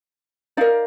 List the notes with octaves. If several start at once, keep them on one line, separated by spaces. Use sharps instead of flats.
D#4 A#4 D5 F5